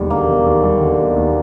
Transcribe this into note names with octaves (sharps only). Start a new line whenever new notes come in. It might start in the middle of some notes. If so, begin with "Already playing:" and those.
Already playing: E1 D#2 D3 G3
D3 A#3
E1
D#2
G3
D3
E1
D#2